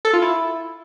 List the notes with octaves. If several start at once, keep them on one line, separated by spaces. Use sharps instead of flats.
A4
F4
E4